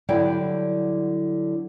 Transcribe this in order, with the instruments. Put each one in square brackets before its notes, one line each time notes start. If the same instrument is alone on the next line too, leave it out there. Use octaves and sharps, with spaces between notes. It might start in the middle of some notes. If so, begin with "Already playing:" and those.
[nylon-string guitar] D3 F#3 G3 E4 D5 G5